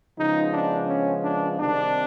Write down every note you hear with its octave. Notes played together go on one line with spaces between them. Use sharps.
C#3 F3 G#3 B3 D#4
D4
C#4
D4
C3 D#3 G3 C4 D4